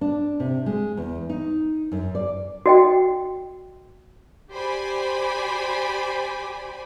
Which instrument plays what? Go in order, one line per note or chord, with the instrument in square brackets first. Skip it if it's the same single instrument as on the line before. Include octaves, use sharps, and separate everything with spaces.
[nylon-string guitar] D4
C3
G#3
E2
D#4
F#2
D5
[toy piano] F#4 D#5 G5
[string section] G4 C5 D5 G#5 B5